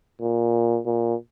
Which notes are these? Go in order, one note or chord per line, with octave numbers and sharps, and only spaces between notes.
A#2
A#2